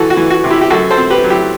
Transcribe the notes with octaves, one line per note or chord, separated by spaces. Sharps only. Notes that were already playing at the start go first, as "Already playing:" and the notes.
Already playing: E3 F#4 A4
F#4
E3
F#4
C3
E4 G4
G4
F#2 F#4 A4
A4 C5
C4
G4 B4
F#3
E4 G4